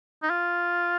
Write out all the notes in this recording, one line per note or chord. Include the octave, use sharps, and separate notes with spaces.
D#4
F4